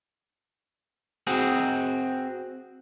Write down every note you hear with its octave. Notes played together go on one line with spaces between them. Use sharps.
C4 F#4 G#4